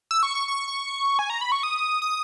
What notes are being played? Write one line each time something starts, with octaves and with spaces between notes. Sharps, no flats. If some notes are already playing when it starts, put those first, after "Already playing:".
E6
C#6
C#6
C#6
C#6
G#5
A#5
B5
C#6
D#6
D#6